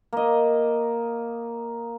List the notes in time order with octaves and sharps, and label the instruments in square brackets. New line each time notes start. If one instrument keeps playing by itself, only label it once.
[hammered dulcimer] A#3 D#5